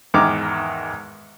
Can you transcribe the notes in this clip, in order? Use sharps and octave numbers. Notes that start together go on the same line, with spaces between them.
E2 G#2 D#3 D6 F6